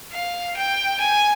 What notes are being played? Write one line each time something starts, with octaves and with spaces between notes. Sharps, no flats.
F5
G5
G#5